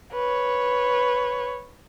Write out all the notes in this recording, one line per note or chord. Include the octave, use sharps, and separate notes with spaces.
B4 C#5